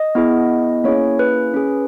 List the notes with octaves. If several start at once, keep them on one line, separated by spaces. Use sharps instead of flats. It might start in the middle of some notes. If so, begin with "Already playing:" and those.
Already playing: D#5
B3 E4 G#4
A#3 C#4 E4 G#4 C#5
B4
C#4 G#4